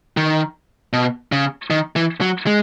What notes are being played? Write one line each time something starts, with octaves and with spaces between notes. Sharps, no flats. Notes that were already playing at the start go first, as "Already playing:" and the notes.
D#3
B2
C#3
D#3
E3
F#3
G#3